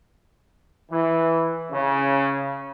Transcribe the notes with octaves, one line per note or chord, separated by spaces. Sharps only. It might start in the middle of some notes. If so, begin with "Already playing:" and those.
E3
C#3